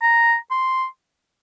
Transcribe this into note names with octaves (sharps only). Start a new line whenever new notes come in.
A#5
C6